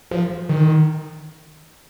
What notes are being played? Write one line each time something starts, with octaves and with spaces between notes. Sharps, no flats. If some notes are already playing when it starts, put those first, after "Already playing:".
F3
D#3